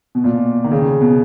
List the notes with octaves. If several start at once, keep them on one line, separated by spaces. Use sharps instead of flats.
B2
A#2
D#3
C#3
B2